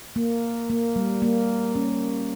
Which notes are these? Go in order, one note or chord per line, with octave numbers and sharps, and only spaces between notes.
A#3
A#3
G3
A#3
C#4